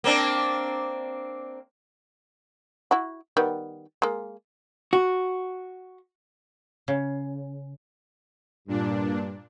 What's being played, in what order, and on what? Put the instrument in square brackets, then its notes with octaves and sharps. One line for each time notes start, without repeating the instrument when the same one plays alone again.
[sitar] A#3 C4 D4
[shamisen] E4 F#4
D#3 G3 B3
G#3 A#3
[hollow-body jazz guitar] F#4
[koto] C#3
[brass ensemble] G2 [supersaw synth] A#2 D4